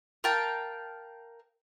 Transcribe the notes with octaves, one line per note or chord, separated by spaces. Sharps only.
A#4 F5 G5 A5